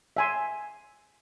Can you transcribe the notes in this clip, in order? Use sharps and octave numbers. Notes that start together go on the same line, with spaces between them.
E5 G#5 C6